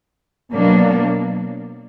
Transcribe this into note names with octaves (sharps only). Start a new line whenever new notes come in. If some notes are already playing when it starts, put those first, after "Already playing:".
B2 F#3 A#3 D4